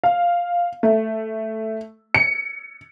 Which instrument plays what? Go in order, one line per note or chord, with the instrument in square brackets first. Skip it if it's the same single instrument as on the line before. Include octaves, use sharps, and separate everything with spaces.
[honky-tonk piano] F5
A3
C#7